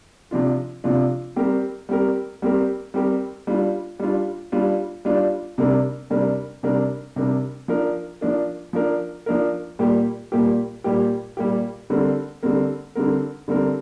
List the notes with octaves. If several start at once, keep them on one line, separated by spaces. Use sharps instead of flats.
C3 F3 D4 F4
C3 F3 D4 F4
G3 C4 G4 A#4
G3 C4 G4 A#4
G3 C4 G4 A#4
G3 C4 G4 A#4
G3 D4 F4
G3 D4 F4
G3 D4 F4
G3 D4 F4
C3 G3 D4 A#4
C3 G3 D4 A#4
C3 G3 D4 A#4
C3 G3 D4 A#4
F3 D4 A#4
F3 D4 A#4
F3 D4 A#4
F3 D4 A#4
A#2 G3 A#3 G4
A#2 G3 A#3 G4
A#2 G3 A#3 G4
A#2 G3 A#3 G4
D3 G3 C4 A#4
D3 G3 C4 A#4
D3 G3 C4 A#4
D3 G3 C4 A#4